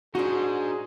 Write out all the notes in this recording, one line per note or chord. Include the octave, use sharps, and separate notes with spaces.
D4 D#4 F#4 G#4 C5